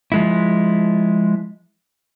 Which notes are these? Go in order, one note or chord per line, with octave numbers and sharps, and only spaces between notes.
F3 G#3 E4